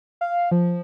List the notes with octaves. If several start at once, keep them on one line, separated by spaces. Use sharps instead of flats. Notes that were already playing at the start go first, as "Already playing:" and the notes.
F5
F3